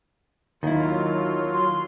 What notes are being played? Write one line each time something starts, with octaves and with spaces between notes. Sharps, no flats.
D#2 D#3 F#3 E4 F4
C6